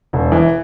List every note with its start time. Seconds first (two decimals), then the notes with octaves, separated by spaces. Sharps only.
0.13 E1
0.32 E3